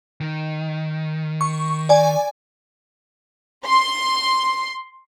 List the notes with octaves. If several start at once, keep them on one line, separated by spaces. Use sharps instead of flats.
D#3
C#6
D5 G#5
C6